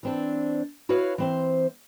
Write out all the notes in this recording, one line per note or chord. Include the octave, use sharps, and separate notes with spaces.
E3 C4 D4
E4 F#4 B4 C#5 F5
E3 C4 C5